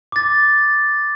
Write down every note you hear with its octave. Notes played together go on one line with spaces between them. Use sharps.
D6 A6